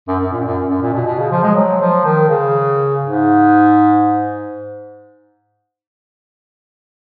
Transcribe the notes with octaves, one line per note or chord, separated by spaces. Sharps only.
F#2
F#2
A#2
F#2
F#2
A#2
B2
B2
C#3
F3
G#3
F#3
F3
D#3
C#3
G#2